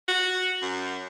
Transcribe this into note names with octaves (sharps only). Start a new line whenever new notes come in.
F#4
F#2